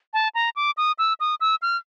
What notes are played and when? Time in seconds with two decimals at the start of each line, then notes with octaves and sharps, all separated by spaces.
0.14 A5
0.35 A#5
0.56 D6
0.77 D#6
0.99 E6
1.20 D#6
1.41 E6
1.62 F6